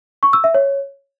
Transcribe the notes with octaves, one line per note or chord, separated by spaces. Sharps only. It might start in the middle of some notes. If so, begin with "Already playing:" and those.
C#6
E6
E5
C#5